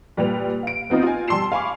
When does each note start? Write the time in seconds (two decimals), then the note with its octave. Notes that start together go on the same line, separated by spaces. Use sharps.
0.17 A#2 G3 B4 F7
0.63 F5 D7
0.90 B3 C4 D#4 F4
1.03 F4 G#5
1.28 G3 A5 C6 E6 C7 E7
1.52 F5 G#5 B5 C#6 D6